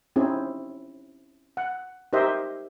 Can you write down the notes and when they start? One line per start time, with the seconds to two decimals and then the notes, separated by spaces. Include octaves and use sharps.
0.16 C4 C#4 D#4 E4 G#4
1.57 F#5
2.13 D#4 G4 A#4 C5 D#5 E5